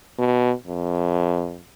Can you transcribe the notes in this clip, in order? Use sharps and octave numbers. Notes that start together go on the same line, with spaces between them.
B2
F2